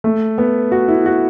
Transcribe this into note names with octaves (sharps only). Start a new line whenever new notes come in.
A3
B3
F#4
E4
F#4